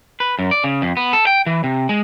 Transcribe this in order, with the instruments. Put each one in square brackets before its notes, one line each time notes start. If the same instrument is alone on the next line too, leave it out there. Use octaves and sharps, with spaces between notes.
[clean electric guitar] B4
F#2
D5
C#3
F2
B3
A4
G5
E3
C3
G#3